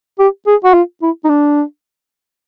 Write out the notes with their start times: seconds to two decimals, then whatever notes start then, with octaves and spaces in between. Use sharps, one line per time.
0.19 G4
0.47 G#4
0.64 F#4
0.74 F4
1.02 E4
1.24 D#4
1.29 D4